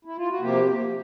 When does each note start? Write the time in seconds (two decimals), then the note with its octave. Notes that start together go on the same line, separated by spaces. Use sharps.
0.05 E4
0.17 F4
0.29 F#4
0.41 C3 F3 A#3 G4